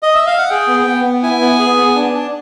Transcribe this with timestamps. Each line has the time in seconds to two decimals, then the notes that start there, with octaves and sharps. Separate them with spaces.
0.03 D#5
0.15 E5
0.27 F5
0.38 F#5
0.49 G#4 G5
0.68 B3
0.86 B3
1.05 B3
1.23 E4 G#5
1.41 B3
1.59 G#4
1.77 B3
1.95 D4
2.13 D4